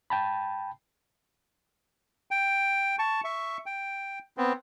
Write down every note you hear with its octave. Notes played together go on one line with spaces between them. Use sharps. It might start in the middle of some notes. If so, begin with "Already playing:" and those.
G5 A5 B5
G5
A5 C#6
E5 C#6
G5
B3 C4